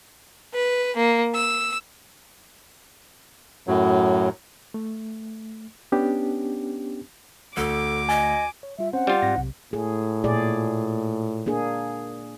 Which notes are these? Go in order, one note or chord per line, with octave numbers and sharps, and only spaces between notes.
B4
A#3
E6
F#2 A2 F#3
A3
B3 C#4 D4 G4
D2 A4 D6
D#5 G#5
C#5
G3 F4 E5
C4 C#4 C5 F#5
G3 F4
G#2 C4 A#6
B1 C3
A2 G#4
A#2 G#4 D5
A#3 D4 G#4